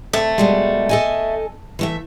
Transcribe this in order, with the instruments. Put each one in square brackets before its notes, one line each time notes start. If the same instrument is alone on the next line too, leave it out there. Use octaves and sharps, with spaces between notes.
[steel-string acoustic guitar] C3 [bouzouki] A3
[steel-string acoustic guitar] B2 G3 G#3
A4 D#5 G#5
E3 A3 E5